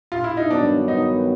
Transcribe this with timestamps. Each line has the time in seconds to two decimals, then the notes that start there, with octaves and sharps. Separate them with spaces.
0.12 F4
0.24 E4
0.37 D#4
0.50 G2 D#3 F#3 B3 D4
0.88 D#4